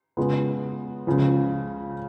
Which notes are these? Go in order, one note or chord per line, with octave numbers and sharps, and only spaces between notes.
C#3 G#3 B3 F4
C#2 C#3 F3